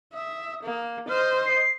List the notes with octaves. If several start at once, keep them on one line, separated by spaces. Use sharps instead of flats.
E5 D#6
A#3
C5 D#5 F6
C7